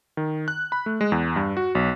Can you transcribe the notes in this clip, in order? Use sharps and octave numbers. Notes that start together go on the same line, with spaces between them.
D#3
F#6
B5
A3
G#3
E2
G2
F#4
B1